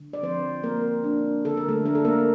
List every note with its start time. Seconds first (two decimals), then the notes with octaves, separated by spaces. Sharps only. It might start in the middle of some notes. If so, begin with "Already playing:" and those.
Already playing: D3
0.13 D5
0.23 F3 C4 C5
0.63 A#3 C4 A#4
1.04 D4
1.45 D3 A4
1.57 A#4
1.69 A3 A4
1.85 D4 A#4
1.95 A4
2.05 A#3 A#4